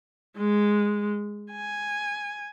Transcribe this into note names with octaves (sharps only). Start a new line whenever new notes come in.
G#3
G#5